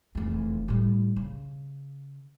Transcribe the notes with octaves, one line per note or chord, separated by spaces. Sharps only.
F1 E2
A2 G3
C#3